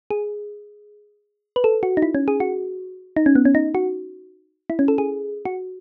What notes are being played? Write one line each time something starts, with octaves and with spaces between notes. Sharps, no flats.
G#4
B4
A4
F#4
D#4
E4
C#4
G#4
F#4
D#4
C#4
B3
C#4
D#4
F#4
E4
C#4
A4
G#4
F#4